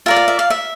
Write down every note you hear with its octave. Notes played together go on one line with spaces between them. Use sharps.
F4 A#4 D5 E5
F5
E5
F5
E5